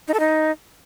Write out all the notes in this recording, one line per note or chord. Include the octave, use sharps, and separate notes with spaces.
D#4
A4
D#4